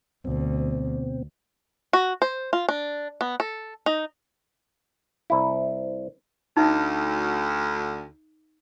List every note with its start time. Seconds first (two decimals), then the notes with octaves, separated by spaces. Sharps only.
0.25 D2 B2 C4
1.93 F#4
2.22 C5
2.53 F4
2.69 D4
3.21 B3
3.40 A4
3.86 D#4
5.30 C2 E4
6.57 D2 D#4 E5